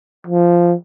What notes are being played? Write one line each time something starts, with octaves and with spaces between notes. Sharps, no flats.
F3